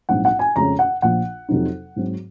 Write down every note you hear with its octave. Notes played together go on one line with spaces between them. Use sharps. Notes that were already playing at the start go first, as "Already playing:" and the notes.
A#1 G#2 F#3 C4 D#4 F#5
F#5
G#5
F2 C#3 G#3 C#4 A#5
F#5
A#1 A#2 F3 F#5
F2 C3 F#3 C4 D#4
G#2 F#3 C4